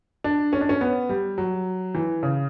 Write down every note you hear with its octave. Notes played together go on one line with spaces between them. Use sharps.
D4
C#4
D4
C#4
B3
G3
F#3
E3
C#3